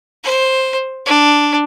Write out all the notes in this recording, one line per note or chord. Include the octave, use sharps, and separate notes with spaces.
C5
D4